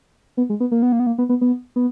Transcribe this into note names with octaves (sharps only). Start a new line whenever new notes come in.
B3
G#3
B3
A#3
B3
A#3
B3
A#3
B3
B3
B3
B3